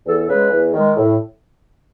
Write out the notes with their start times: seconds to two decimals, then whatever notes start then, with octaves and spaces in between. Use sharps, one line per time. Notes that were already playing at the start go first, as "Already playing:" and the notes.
0.06 E2 A4
0.18 A4
0.29 C#3 G#3 B4
0.51 E2
0.74 D#3 G#3
0.96 A2